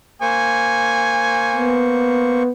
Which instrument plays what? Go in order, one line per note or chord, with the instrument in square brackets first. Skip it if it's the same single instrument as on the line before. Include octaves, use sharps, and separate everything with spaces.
[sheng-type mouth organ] A#3 C5 C#6 [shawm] G#5
[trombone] B3